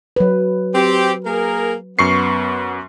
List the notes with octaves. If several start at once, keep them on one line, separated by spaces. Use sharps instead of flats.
F#3 B4
C4 G4
A#3 G#4 A#4
F#2 B3 C#6 C7